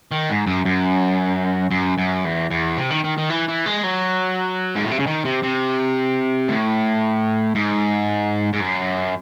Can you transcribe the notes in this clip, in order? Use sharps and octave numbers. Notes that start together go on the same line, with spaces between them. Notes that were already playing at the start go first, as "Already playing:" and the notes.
D#3
G#2
F#2
F#2
F#2
F#2
E2
E2
C3
D#3
D#3
D#3
E3
E3
G#3
F#3
G#2
A2
C3
C#3
D#3
C3
C3
A2
G#2
G#2
F#2